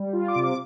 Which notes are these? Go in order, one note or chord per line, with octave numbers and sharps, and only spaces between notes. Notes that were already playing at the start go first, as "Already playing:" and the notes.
Already playing: G3
F4
D6
C3
D6